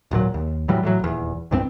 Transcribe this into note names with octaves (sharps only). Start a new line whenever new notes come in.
D#1 G#1 A#2 F#3
D#2
A2 E3 F#3 G3
A2 E3 F#3
D#1 E2
C2 G2 F#3 C4